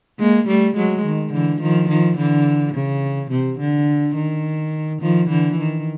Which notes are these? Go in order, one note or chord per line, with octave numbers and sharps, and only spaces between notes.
G#3 A#3
G3 A3
F#3 G#3
D#3
D3 E3
D#3 F3
D#3 F3
D3 E3
C#3
C3
D3
D#3
D#3 F3
D3 E3
D#3